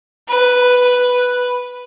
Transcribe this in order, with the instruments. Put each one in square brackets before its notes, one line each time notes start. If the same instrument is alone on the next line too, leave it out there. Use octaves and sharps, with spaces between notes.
[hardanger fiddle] B4